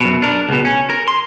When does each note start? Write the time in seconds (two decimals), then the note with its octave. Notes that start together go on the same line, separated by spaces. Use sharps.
0.01 F#2 B2
0.22 D4 A#4
0.49 C#2 B2
0.65 C#4
0.90 A#4
1.08 C6